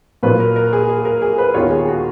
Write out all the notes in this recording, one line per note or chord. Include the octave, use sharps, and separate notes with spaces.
A#2 F#3 A#3 F4 B4
A#4
A#4
G#4
G#4
A#4
G#4
B4
D#2 D#3 G#3 B3 F4 C#5
G#4
F#4